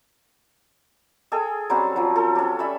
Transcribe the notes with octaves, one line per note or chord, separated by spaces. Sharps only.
G#4 A4 G5 G#5
F#3 G3 C4 C#4
F3 F#3
A4
C#4 G4
G3 E5 G#5 B5